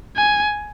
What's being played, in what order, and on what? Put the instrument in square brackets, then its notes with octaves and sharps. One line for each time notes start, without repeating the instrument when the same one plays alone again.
[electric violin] G#5